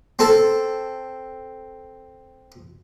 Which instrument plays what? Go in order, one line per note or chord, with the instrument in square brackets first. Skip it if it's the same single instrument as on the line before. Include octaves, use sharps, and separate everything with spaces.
[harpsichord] C4 A4